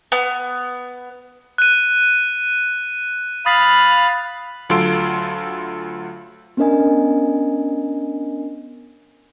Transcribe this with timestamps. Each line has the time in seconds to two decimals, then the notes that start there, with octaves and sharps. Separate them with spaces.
0.12 B3
1.58 F#6 D#7
3.46 F5 B5 D#6 A6
4.70 D2 F#3 F4 A4 C6 D7
6.57 B3 C#4 D4 A#4 D#5 G#5